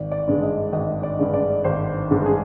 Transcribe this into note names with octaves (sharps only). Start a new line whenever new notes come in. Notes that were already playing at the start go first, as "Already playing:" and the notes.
Already playing: G#1 D5
D5
G2 D3 G#3
D#5
G#1 D#5
D5
G2 D3 G#3
D5
G#1 C5
G2 D3 G#3
G#4